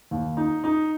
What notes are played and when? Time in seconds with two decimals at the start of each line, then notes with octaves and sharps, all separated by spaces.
0.11 D#2
0.37 D#4
0.64 D#4